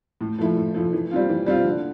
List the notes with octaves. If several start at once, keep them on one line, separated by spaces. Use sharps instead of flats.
A2
F3 A3 E4
A2
F3 A3 E4
E3
G3 C4 F4
E3
G3 C4 F4
D3